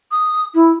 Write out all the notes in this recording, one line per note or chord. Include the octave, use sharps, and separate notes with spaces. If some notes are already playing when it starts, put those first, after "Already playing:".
D#6
E4